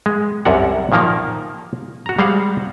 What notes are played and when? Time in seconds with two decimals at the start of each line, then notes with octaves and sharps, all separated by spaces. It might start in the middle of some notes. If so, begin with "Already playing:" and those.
0.06 G#3
0.45 C2 F#2 C3 A4 A#4 F#5
0.92 A#2 D#3 F3 A#3 A#4
2.06 F#4 A#5
2.19 G3 G#3 C5 F5 F#5